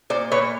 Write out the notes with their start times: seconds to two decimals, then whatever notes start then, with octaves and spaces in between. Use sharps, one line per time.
0.10 A#2 C5 D5
0.31 A#2 B4 C#5